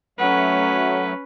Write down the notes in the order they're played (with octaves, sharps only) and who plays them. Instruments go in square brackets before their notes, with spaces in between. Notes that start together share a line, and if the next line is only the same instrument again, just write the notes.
[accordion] F#3 A3 [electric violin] C#4 B4 [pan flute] F#5